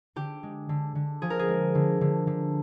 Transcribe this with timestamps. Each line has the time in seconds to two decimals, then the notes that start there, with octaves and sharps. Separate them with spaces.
0.16 D3 G4
0.43 G#3
0.69 D3
0.95 D3
1.22 F3 G#4
1.30 A#4
1.39 G#4
1.49 G#3
1.75 D3
2.01 D3
2.27 D3